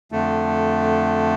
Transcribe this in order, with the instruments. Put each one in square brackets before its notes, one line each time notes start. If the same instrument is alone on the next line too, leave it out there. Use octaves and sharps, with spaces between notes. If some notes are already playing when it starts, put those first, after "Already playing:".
[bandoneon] F2 D3 A3